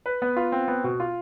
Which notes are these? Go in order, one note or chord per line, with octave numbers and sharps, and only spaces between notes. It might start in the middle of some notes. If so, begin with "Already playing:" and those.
B4
B3
F4
C4
B3
B2
F4